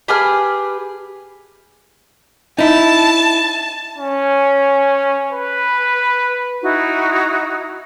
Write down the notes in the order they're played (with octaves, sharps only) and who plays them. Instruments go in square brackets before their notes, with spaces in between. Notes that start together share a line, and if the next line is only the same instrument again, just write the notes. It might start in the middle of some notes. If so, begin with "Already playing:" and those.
[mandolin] G4 G#4 B4 F6
[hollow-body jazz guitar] D#4 E4 [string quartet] A5
[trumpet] C#4
B4
[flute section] D#4 E4 F#4